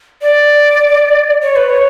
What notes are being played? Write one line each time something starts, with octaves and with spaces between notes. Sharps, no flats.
D5
C#5
B4
C#5